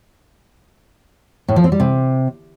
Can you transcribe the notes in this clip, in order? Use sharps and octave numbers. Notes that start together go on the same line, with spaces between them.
A2
F3
C4
G3
C3